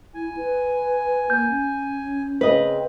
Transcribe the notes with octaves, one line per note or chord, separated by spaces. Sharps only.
E4 G#5
B4
A#3 G6
C#4
C#3 C4 B4 D#5